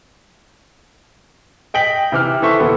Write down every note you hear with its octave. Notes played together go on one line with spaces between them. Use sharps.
D#5 G5 B6 F#7
C3 E3 D6 F6
E3 A4 C5 E5 C#6 E6
D#1 B3 A4